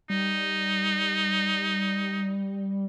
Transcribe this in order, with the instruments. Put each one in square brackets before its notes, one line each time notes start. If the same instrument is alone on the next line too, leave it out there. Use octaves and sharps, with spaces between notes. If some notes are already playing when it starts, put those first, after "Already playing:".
[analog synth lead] G3 [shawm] D#4